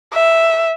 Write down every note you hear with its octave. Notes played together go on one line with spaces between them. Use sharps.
E5